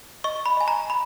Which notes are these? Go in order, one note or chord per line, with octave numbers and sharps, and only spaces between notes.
D#5 C#6
B5
D#5 G#5
A#5
B5